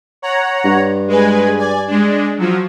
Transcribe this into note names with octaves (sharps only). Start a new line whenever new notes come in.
C#5 F#5 A#5
G2
G#3 B4 G#5
D5 G#5
G#3 D4
F3 F#3